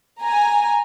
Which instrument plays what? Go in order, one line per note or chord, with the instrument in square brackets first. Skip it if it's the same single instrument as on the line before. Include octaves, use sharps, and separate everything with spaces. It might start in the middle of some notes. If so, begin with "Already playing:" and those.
[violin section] G#5 A#5